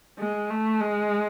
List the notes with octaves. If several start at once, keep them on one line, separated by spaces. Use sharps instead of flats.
G#3
A3
G#3